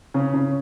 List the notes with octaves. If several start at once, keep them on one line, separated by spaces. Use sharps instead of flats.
C#3 C#4
C#3 C#4